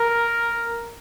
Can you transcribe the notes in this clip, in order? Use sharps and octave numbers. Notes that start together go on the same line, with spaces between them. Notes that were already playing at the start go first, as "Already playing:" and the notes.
Already playing: A#4